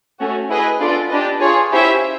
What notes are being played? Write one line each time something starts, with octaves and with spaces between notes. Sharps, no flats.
A3 C#4 F#4
E4 G#4 B4 D#5 G#5
B3 D4 F4 A4 D5
D4 G4 B4 D#5
F4 G#4 C#5
C#4 E4 G4 C5 E5